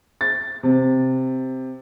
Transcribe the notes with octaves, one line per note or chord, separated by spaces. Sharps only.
A6
C3